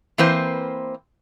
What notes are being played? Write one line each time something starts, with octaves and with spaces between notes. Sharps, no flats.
E3 A#3 C4 B4 C5